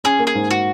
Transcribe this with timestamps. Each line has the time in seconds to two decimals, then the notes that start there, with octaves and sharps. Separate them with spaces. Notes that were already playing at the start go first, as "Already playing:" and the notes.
0.04 C#4 G#4
0.19 A#3
0.27 G#4
0.35 G#2
0.51 F#4